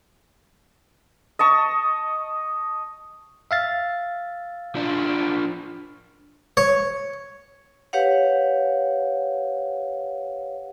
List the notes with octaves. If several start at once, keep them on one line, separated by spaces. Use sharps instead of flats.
D#5 A5 C#6
E5 F5 A6
F3 D4
C#5
G4 B4 C#5 F5 F#5